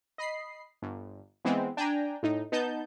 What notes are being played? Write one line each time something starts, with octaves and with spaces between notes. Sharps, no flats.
D#5 B5 C7
G1
E3 G#3 B3 C4
D4 G5 G#5 A#5
A2 D#4
B3 D#4 A5 G6